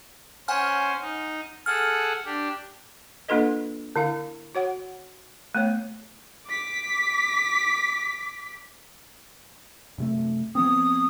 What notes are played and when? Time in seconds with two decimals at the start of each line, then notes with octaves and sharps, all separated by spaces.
0.48 C#4 C5 F#5 G#5 F6
1.01 D#4
1.66 G#4 A4 F#5 F6
2.25 D4 G4
3.28 A#3 D4 F4 A4 B4 D#5
3.96 D3 E4 F5
4.55 F#4 C#5 F#5
5.55 A3 B3 C#5
6.47 D6 B6
9.98 F#2 C3 A3
10.55 F3 B3 C4 D#6